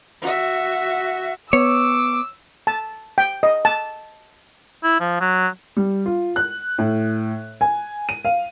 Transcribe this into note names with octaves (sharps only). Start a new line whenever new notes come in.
F#4 E5
B3 C#5 D6 E6
A5
G5
D#5
A5
E4
F3
F#3
G3
F4
F#6
A2
G#5
D#7
F5